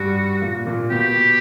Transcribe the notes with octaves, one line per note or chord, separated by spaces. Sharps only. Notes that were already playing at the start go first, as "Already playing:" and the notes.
Already playing: G2 G3 F#4
A#2 A#3
A#2 A#3
A#3
B2 B3 G4